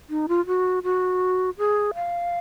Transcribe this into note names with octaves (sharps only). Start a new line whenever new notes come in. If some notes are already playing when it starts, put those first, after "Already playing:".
D#4
F4
F#4
F#4
G#4
F5